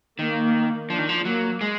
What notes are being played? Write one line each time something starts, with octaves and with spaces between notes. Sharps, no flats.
D#3 A#3
F3 D4
D#3
F3
F#3 A#3
G#3